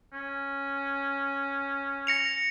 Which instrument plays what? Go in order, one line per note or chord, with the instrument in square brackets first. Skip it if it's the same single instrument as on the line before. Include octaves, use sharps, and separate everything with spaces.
[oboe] C#4
[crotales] A#6 C#7 F7